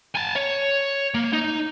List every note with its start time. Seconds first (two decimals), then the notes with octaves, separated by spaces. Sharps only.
0.15 G#5 A5
0.36 C#5
1.15 A#3
1.33 D#4